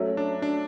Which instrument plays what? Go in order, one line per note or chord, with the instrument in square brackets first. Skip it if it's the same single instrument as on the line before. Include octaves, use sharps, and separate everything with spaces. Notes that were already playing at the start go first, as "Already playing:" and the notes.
Already playing: [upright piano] F#3 A3 C#4
[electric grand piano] D4
D4